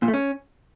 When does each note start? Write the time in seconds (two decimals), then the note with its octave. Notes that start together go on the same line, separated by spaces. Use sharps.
0.02 A#2
0.08 A3
0.14 C#4